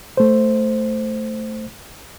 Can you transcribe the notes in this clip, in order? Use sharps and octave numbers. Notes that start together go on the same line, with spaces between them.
A3 C5